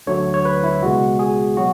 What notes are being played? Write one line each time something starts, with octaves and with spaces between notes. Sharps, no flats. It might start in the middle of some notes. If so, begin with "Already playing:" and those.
D2 D3 F#3 A3 C#5
C#5
B4
E4
C#2 B2 G#3 B3 F#4
G#4
B2 F#3 F#4